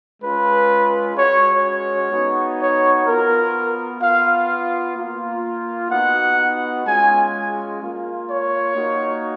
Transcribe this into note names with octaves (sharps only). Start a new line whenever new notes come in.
G#3 C#4 F4 B4
G#3 C#4 F#4 C#5
C#5
B3 D#4 F#4
C#5
B3 F4 A#4
B3 F4 F5
A#3 F4
B3 D#4 F#4 F#5
G#3 C#4 F4 G#5
A#3 F4
C#5
A#3 D#4 F#4